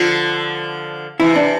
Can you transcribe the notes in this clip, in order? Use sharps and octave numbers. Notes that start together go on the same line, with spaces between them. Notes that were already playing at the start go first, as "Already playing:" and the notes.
Already playing: D3 F3 F4
C3 E3 E4
D4